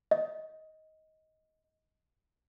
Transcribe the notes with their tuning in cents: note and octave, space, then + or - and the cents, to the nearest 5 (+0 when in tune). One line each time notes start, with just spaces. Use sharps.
D#5 +15